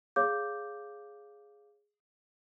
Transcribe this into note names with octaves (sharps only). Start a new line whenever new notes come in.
G#4 C#5 F5 D6 G6